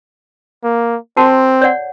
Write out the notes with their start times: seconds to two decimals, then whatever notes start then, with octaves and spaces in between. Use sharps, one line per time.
0.64 A#3
1.17 C4 F#4 A#4 A5
1.61 C#5 D5 F#5